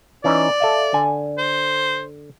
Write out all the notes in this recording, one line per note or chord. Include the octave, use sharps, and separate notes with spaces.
E3 C#4 D#4 D5
A4 E5 F5
D3 G#5
C5